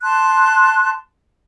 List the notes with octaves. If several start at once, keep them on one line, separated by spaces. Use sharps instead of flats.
A5 C6 F#6